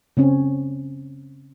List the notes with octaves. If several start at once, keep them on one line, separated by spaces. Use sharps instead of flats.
C#3 C4 C#4